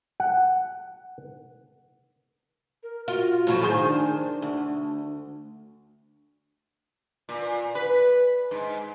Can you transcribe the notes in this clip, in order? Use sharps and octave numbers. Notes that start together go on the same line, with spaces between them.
F#5
A#4
F4 F#4
A2 F3 F#3
D#3 G#4 C5
D4
D2
A#2
B4
G#2